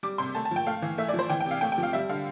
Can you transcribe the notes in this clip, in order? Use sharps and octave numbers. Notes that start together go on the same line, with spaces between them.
G3 D6
C3 C6
A3 A5
A5
F3 G5
A3 F5
E3
A3 E5
D5
F3
C5
E3 G5
G5
C3
F5
A3 G5
G5
F3
F5
G3 E5
D3 F5